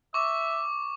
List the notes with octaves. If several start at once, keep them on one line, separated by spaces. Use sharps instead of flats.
E5 C#6 D6